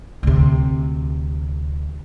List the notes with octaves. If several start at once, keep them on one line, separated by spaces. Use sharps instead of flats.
D2 C3